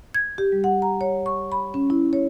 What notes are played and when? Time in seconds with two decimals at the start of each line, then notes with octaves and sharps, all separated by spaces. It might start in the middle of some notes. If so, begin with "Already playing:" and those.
0.14 G#6
0.38 G4
0.52 G3
0.64 F#5
0.82 A#5
1.01 C#5
1.26 C#6
1.52 B5
1.74 C#4
1.90 E4
2.13 C#5